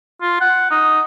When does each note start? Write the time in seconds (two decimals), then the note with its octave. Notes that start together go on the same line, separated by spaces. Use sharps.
0.22 F4
0.41 F#5
0.71 D#4